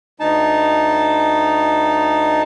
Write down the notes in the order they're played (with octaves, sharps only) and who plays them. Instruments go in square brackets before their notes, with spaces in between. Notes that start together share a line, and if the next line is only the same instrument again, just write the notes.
[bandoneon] D2 D#4 A5